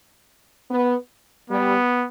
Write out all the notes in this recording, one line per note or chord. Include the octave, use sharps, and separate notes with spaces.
B3
G3 B3